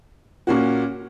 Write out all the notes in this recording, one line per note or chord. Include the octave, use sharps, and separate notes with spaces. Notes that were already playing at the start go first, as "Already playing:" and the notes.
A#2 A#3 C#4 F#4